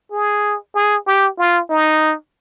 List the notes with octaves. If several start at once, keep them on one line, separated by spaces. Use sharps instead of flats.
G#4
G#4
G4
F4
D#4